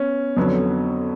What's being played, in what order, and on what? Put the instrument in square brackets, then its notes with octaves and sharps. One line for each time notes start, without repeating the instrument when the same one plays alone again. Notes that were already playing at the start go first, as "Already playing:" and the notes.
Already playing: [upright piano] B3 [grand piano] C#4
[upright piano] F2 D3 F#3 B3